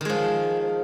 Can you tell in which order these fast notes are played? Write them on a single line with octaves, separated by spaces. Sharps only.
D#3 G#3 F3